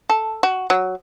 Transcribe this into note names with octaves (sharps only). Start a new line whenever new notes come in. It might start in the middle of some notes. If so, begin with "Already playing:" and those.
A4
F#4
F#3